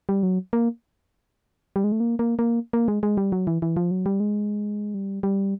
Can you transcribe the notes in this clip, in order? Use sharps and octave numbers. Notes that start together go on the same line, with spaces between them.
G3
F#3
A#3
G3
G#3
A3
A#3
A#3
A#3
A#3
G#3
G#3
G3
F#3
E3
E3
F3
F#3
G3
G#3
G3
G3